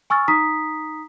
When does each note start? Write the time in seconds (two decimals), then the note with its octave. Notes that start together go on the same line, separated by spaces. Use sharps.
0.10 G#5 C#6 E6 F6 A6
0.28 D#4 A#5 D#6 B6